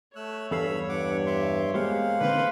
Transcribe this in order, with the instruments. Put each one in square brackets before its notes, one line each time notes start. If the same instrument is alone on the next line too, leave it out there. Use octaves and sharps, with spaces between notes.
[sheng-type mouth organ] A3 E6 F#6 [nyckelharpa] C#5
[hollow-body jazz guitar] E2 A4 F5 [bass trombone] G2 [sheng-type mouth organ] B5 E6
[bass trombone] G2 [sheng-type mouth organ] F#5 D6
[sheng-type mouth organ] E5 C6 D6
[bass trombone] G#3 [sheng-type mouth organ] A#3 F5 F#5 [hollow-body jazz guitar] B3 G4 C5
[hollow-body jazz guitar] D3 D#3 C4 [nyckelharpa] B4 C5